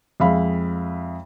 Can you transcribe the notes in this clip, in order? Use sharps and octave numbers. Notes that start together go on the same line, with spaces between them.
F2 G#3 E5 F5 B5